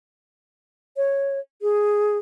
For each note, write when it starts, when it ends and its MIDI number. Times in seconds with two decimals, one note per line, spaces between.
0.97 1.39 73
1.62 2.18 68